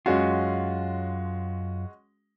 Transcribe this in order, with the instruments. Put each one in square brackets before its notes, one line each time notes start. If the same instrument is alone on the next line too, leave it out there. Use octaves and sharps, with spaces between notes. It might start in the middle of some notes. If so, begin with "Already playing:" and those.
[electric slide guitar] F#2 F4 [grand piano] G#3 C#4 F#4